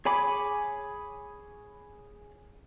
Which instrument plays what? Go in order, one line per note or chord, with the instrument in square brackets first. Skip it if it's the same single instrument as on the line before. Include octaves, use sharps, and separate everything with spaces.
[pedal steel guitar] G#4 C#5 G#5 B5 D6